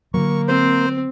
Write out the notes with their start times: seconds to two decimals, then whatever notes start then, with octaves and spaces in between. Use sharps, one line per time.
0.14 D3 F#3 A#3 C#6
0.48 C4 C5